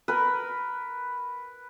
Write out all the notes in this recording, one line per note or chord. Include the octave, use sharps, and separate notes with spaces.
A#4 B4